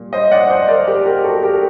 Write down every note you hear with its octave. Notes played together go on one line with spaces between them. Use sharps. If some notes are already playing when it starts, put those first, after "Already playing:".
Already playing: A#2 G3
C5 D#5
D5 F#5
C5 D#5
A#4 D5
G4 A#4
G4 A#4
F#4 A4
G4 A#4